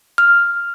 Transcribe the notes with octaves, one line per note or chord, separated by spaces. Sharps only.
F6